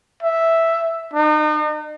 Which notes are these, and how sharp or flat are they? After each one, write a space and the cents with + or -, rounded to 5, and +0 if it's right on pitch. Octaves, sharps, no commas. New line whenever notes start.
E5 +0
D#4 -40